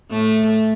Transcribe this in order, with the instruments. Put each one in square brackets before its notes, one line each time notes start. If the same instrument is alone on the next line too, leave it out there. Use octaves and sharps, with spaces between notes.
[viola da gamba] A2 A3